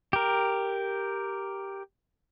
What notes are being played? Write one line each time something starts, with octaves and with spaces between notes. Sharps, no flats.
G4 A#4